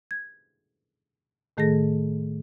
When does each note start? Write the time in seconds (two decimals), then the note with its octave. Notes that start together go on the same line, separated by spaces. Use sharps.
0.11 G#6
1.57 A2 D#3 A3 G#4 A4 A#6